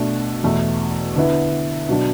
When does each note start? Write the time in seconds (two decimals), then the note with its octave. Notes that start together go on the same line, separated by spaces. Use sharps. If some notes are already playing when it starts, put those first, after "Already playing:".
Already playing: B2 A3 D4
0.44 E2 B2 A3
1.16 D3 B3 E4
1.89 B2 F#3 D4